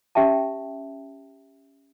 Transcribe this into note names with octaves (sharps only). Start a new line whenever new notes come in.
C#4 G4 E5 G5 A5